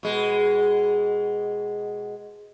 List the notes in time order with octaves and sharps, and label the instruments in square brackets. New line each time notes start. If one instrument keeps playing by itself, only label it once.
[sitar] B2 G#3